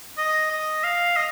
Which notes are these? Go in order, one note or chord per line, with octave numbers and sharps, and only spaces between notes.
D#5
D#5
F5
D#5